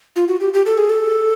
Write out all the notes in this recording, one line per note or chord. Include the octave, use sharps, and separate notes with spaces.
F4
F#4
G4
G4
A4
G#4
A4